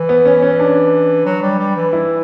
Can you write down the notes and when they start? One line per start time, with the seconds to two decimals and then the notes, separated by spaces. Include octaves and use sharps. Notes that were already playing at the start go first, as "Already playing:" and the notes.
Already playing: E3
0.09 B3
0.25 C#4
0.42 C#4
0.60 D4
1.26 F#3
1.42 G3
1.59 G3
1.76 E3
1.93 E4